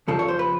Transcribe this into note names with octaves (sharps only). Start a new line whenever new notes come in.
F2 C#3 F3 A4
C#5
C5
B4